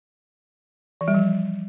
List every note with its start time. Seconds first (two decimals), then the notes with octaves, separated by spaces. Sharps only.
1.01 E3
1.08 G3
1.14 F3